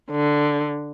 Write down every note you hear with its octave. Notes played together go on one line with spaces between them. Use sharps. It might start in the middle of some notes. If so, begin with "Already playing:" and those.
D3